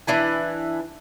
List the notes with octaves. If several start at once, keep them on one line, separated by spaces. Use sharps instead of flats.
E3 D4 E4 G#5